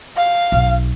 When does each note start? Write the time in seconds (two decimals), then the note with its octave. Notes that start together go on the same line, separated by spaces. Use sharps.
0.16 F5
0.52 B1